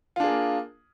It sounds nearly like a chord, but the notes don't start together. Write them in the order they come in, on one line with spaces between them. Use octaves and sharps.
F4 D4 G#4 A#3